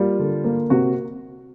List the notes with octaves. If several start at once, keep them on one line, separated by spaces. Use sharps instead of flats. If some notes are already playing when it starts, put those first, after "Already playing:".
Already playing: G3 A#3 F4
D3
A#3
C3 F#4